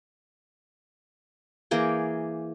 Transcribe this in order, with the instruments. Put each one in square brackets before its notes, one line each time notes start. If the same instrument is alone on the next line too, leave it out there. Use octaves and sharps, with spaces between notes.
[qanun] E3 A#3 G#4 G5